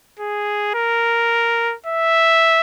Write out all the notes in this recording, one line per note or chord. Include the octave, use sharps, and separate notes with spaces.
G#4
A#4
E5